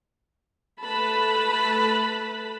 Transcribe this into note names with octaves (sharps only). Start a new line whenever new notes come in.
A3 B4 A5 B5